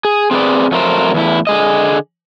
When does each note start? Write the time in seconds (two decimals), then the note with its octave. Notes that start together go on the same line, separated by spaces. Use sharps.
0.05 G#4
0.31 C4 G#4 B4 D5
0.72 F2 F#3 A3 A#4 C5
1.14 E2 A2 E4
1.47 D3 G#4 D#5